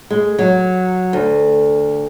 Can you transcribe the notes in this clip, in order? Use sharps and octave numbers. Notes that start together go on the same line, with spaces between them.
G#3
F#3
D2